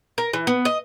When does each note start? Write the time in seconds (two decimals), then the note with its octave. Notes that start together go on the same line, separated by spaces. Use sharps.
0.18 A#4
0.33 E3
0.47 B3
0.65 D#5